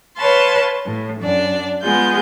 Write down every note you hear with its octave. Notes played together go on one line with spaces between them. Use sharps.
B4 C#5 F5 A5 C6
A2
F#2 D4 D5
G#3 B3 F4 G#4 G6